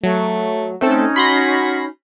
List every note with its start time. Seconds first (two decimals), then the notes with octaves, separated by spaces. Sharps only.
0.03 F#3 A3
0.81 A3 C4 C#4 D#4 A4
1.16 F#4 B5 C6 A#6